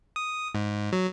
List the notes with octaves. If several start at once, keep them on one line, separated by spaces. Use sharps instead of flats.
D#6
G#2
F#3